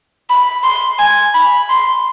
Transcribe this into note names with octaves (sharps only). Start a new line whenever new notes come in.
B5
C6
G#5
B5
C6